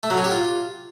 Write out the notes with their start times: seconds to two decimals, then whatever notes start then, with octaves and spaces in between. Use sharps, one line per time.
0.03 A3
0.10 F#3
0.17 C#4
0.24 G4
0.31 F4